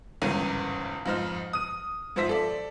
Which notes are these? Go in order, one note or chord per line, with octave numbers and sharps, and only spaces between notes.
G1 E2 G#2 C#3 A#4 D#7
F2 G#2 D#4 C5 F6
D#6 D#7
G#2 F3 C5 E5 B6
A4 D5